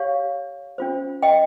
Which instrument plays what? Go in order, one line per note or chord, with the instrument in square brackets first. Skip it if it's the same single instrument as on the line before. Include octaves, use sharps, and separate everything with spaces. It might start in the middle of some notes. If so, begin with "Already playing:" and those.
Already playing: [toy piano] G4 C#5 F5
C#4 F4 C5
D#5 G5